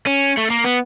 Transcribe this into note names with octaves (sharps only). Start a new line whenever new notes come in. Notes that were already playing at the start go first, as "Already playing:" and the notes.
C#4
A3
A#3
B3